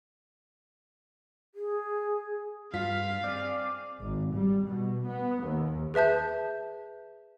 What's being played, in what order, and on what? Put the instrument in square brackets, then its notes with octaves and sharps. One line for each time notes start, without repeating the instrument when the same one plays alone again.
[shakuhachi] G#4
[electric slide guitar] G2 [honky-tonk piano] F4 [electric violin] F5 [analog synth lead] B6
[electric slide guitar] C4 G#4 [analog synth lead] D5
[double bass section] G#1
G3
B2
B3
D#2
[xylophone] G#4 B4 E5 A5 G6